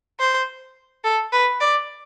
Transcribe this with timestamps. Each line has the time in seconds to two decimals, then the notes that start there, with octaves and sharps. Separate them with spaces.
0.20 C5
1.04 A4
1.33 B4
1.61 D5